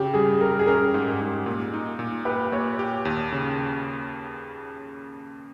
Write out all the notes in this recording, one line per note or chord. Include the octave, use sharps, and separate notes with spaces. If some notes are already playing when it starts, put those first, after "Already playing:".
Already playing: C#3 G4
G3 G#4
G3 A#4
G#4
C#4 A#4
G#2
G#2
A#2
D#4
A#2
G4 B4
A#2 C#5
G4
D#2
C#3